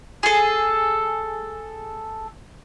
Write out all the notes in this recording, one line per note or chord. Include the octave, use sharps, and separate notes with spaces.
G#4 A4